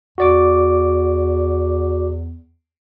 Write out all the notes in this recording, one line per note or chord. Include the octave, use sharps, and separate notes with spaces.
E2 F#4 D5 D6